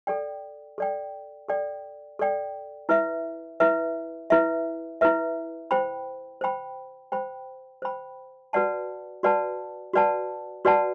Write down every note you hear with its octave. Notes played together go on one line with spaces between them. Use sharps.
A4 D5 G5
A4 D5 G5
A4 D5 G5
A4 D5 G5
E4 B4 E5
E4 B4 E5
E4 B4 E5
E4 B4 E5
C5 G5 B5
C5 G5 B5
C5 G5 B5
C5 G5 B5
F#4 B4 D5 F#5 A5
F#4 B4 D5 F#5 A5
F#4 B4 D5 F#5 A5
F#4 B4 D5 F#5 A5